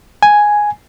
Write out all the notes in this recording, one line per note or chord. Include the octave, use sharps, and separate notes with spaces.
G#5